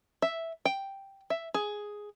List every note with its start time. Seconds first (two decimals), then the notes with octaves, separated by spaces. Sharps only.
0.22 E5
0.65 G5
1.30 E5
1.54 G#4